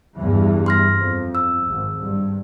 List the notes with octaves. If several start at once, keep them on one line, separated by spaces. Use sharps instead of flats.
E2 G2 E3
C6 F6 A#6
F2
E6
G#1
G2